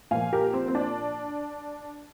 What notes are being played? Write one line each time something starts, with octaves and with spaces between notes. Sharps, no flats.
A#2 F3 A#3 F5 G#5
G4 A#4
C4
C4
D4